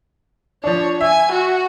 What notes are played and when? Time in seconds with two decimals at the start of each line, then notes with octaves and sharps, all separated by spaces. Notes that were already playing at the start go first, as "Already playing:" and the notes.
0.64 F3 D4 C#5
1.01 E5 G#5
1.32 F#4